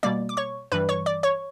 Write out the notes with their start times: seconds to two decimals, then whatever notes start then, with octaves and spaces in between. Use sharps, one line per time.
0.03 B2 G3 A#3 D5 D6
0.29 D6
0.37 C#5 C#6
0.72 G2 E3 G3 B4 B5
0.89 C#5 C#6
1.06 D5 D6
1.23 C#5 C#6